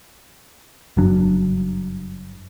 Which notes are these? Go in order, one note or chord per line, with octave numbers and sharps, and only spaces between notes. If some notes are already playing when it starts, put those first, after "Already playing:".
F#1 G2 F#3 D4